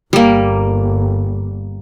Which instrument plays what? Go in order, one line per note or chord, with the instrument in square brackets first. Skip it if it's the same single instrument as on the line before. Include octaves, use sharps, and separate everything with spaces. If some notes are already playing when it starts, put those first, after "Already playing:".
[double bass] G1 [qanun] G3 A#3